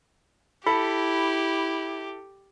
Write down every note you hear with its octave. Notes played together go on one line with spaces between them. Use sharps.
E4 G4 A4 B5